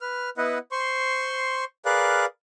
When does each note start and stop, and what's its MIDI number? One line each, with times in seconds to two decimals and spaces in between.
0.01 0.30 71
0.01 0.30 89
0.37 0.58 59
0.37 0.58 64
0.37 0.58 71
0.37 0.58 75
0.37 0.58 78
0.72 1.64 72
0.72 1.64 84
0.72 1.64 85
1.85 2.26 68
1.85 2.26 70
1.85 2.26 71
1.85 2.26 74
1.85 2.26 77
1.85 2.26 90